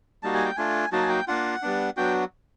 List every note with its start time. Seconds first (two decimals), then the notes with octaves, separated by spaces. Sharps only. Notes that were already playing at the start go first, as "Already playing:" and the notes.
0.23 G3 A#3 D#4 F#4 A5
0.34 G#5
0.45 G5
0.57 A3 D4 F4 G#5
0.92 F#3 A#3 D#4 F#4 A5
1.03 G#5
1.09 G5
1.28 A#3 D4 F4 F#5
1.62 G3 B3 D4
1.97 F#3 B3 D4 F#4 G5